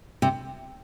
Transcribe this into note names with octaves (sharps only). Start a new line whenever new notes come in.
C3